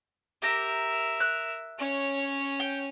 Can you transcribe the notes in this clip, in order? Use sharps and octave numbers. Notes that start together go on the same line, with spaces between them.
G4 A#4 E5 A#5
F#6
C#4 C#5
G5